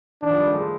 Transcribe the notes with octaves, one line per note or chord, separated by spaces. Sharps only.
D#3 D4
F3
G3
A3
G#3